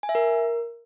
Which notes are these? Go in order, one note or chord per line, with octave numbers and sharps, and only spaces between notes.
G#5
E5
A#4